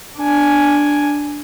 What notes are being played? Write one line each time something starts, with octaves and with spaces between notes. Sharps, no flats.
D4 G#5